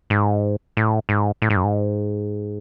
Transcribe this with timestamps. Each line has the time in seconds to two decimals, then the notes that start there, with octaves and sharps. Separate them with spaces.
0.10 G#2
0.77 A2
1.09 G#2
1.42 A2
1.50 G#2
1.56 F#2
1.64 G#2